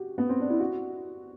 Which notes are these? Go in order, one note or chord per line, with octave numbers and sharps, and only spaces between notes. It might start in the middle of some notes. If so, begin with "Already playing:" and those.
Already playing: F#4 G4
B3
C4
D4
E4
F#4